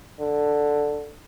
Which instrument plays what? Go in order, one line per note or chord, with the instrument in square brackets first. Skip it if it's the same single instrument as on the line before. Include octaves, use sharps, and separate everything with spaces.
[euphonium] D3